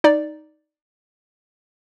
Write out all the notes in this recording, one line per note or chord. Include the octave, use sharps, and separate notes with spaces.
D#4 D5